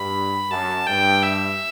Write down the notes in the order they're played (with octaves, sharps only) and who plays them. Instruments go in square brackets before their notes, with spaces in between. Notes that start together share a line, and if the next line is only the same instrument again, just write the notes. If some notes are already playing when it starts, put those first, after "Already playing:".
Already playing: [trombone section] G2 [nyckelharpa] B5
[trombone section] F#2 [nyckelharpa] A5
[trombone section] G2 [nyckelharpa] G5
[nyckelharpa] E5